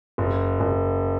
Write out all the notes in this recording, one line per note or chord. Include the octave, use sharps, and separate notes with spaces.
F#1
F#1